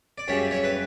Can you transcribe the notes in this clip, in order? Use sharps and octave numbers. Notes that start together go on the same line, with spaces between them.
D5
F#2 C#3 G3 C#5 E5
C#5 E5
B4